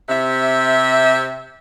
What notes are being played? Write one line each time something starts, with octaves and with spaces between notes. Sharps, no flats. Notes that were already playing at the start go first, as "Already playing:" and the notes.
C3 E5